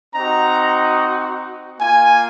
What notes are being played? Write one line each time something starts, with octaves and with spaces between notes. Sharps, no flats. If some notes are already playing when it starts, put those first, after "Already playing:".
C4 D#4 F#4 A#5
A#3 F4 G#5